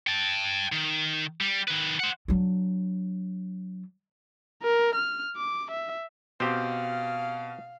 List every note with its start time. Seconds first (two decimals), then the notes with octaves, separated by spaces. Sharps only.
0.07 G5 A5
0.72 D#3
1.41 G3
1.68 D#3 B4
2.00 C5 F#5
2.28 F#3 D4
4.62 A#4
4.96 F6
5.36 D6
5.71 E5
6.40 B2 C4 G4 C5 F5